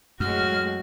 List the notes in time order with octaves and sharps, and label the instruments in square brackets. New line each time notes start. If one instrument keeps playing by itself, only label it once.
[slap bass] F#2 [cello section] A2 G#3 [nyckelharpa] F#4 [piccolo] F6